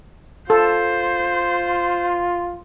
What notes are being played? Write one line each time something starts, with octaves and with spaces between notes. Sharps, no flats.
F4 A4 C5